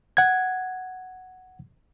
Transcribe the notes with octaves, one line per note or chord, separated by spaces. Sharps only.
F#5 G#6